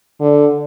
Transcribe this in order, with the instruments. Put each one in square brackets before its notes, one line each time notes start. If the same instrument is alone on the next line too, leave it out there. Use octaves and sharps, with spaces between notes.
[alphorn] D3